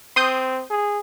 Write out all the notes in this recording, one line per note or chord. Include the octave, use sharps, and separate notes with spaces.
C4 C6 D#6 G6
G#4